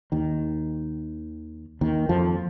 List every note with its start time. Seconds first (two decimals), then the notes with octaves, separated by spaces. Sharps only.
0.12 D#2 D#3
1.81 D#2 D#3
2.09 F2 F3